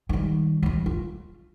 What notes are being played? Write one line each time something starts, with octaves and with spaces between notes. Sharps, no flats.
D#3 G3
D#2 E3
F4